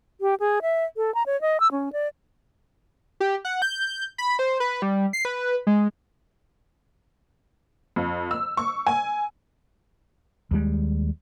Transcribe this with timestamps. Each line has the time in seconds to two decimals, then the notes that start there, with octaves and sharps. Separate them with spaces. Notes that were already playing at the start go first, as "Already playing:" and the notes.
0.21 G4
0.40 G#4
0.62 E5
0.97 A4
1.15 A#5
1.26 C#5
1.41 D#5
1.60 E6
1.72 C#4
1.93 D5
3.20 G4
3.45 F#5
3.62 G6
4.18 B5
4.39 C5
4.60 B4
4.82 G3
5.13 C7
5.25 B4
5.67 G#3
7.96 F2
8.31 E6
8.57 C#6
8.87 G#5
10.51 D#2 G3 G#3